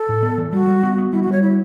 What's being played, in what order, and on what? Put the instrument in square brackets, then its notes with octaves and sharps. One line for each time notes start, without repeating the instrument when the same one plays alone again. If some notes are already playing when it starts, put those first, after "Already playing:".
Already playing: [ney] A4
[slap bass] A2
B3
E3
[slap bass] G3 [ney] F#4
[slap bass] G3
B3
B3
[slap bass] G3 [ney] E4
[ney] F#4
[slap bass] G3
[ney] C#5
E4